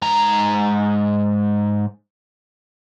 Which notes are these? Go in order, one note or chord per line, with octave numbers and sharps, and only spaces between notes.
G#2 A#5